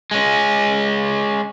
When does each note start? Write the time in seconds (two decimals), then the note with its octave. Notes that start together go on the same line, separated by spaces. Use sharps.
0.11 G#3 C#4